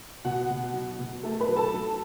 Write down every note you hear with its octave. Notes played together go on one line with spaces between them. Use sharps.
B2 F#4 F#5
B2
F#3
B2
A3 A4 A5
B4 B5
F#3
A4 A5
F#3